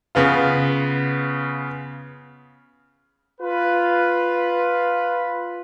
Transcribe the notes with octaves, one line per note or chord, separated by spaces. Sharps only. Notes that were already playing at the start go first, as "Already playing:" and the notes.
C#3 B3 F4
F4 B4